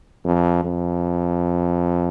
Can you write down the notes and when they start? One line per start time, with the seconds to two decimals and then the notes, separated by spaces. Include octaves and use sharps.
0.24 F2
0.64 F2